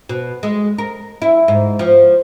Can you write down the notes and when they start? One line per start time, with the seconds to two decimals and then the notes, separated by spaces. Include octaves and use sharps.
0.09 B2
0.43 G#3
0.78 A#4
1.22 E4
1.48 G#2
1.79 F3